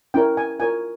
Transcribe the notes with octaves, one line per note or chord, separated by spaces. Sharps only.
C#4 E4 A#4 C#5 G5
G#5
F4 A#4 C#5 G#5